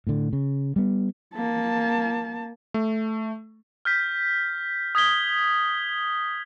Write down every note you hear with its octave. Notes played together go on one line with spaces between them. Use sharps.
A2 D3
C#3
G3 B3
A#3 A5
A3
F6 G6 B6
D#6 G#6 B6 G7